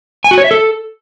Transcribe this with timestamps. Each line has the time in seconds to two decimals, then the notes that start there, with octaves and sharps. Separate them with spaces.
0.24 G#5
0.31 F#4
0.38 C#5
0.44 E5
0.51 A4